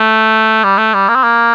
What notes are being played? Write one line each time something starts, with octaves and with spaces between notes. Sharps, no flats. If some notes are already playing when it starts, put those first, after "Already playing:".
Already playing: A3
G3
A3
G3
A#3
C4
A#3